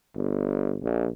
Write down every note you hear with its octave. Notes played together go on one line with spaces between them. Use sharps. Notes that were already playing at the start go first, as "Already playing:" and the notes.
G1
A#1